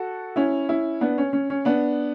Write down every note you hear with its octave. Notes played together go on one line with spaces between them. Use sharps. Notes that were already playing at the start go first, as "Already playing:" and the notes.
Already playing: F#4 A4
C#4 E4
C#4 E4
B3 D4
C#4
C#4
C#4
B3 D4